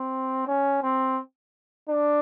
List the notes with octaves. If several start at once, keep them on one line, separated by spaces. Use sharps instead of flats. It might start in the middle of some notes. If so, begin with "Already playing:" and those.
Already playing: C4
C#4
C4
D4